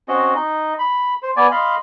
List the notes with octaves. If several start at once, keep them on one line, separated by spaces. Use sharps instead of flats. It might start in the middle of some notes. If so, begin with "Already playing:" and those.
C4 C#4 F#4 D#5
D#4 D#5
B5
C5
B3 D5 G#5
D#5 F5 B5 C6